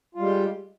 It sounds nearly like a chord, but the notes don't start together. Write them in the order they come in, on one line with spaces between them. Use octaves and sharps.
F4 G3 G#3 G4